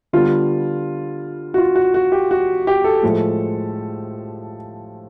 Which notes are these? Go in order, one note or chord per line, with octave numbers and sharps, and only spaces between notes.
D3 G3 B3 F4
F#4
F4
F#4
F#4
G4
F#4
G4
A4
A2 F3 G#3